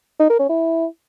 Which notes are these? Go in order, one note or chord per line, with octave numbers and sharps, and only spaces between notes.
D#4
A#4
C#4
E4